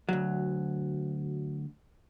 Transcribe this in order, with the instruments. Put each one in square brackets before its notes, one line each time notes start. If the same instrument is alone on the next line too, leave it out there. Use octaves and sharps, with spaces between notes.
[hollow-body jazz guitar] D2 F#3